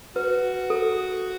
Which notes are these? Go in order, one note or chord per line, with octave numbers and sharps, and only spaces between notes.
F#4 B4
A4